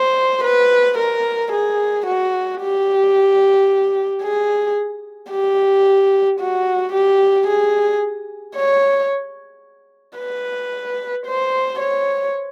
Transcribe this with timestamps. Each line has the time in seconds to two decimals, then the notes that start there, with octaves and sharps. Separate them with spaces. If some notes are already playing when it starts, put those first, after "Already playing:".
Already playing: C5
0.44 B4
0.98 A#4
1.52 G#4
2.06 F#4
2.61 G4
4.22 G#4
5.31 G4
6.40 F#4
6.93 G4
7.47 G#4
8.56 C#5
10.18 B4
11.26 C5
11.80 C#5